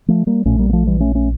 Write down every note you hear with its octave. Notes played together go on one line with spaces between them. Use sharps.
F3 A3
G3 A#3
A#1 A#2 A3 C#4
G3 A#3
A#3
F3 A3
E3 G3
A3 C#4
A3 C#4